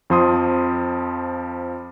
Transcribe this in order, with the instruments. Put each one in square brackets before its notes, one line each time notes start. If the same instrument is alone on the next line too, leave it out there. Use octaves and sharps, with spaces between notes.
[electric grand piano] F2 F3 C6 D#6